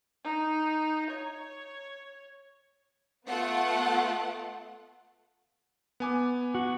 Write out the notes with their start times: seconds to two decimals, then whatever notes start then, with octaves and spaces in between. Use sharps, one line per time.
0.24 D#4
1.10 C#5
3.27 A3 B3 F4 F#5
6.00 B3 G#5 D6
6.55 F#4